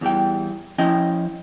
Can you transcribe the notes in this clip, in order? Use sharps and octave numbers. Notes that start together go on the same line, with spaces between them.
E2 E3 G3 G5
F3 C#4 E4 D#5 G5